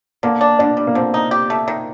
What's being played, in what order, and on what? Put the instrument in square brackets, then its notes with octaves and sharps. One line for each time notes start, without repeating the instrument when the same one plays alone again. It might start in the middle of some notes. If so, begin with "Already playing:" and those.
[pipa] D3 [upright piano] A#3
[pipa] D4
[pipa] D3 [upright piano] D4
[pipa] G3
[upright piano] A#3
[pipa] D3 [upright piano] C4
[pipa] D#4
G4
A3
D#3